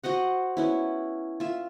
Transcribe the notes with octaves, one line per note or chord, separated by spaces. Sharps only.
F#4 C5 D#5 F#5
B3 C#4 E4
F4 E5